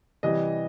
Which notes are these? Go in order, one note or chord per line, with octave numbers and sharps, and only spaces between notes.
C3 E3 G3 D#5